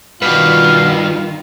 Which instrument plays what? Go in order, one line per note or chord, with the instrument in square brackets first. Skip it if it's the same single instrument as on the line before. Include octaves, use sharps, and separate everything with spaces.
[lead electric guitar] G2 [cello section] D#3 F4 [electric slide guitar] F#4 B4 [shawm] F5